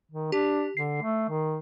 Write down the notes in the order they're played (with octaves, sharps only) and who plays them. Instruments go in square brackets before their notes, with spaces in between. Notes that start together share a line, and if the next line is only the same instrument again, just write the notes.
[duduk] D#3
[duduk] D4 [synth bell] G4
[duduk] D3 [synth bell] C7
[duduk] A3
D#3